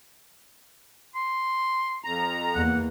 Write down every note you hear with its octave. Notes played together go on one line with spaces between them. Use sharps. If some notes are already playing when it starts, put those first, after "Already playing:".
C6
F2 A#5
E2 A#3 F#5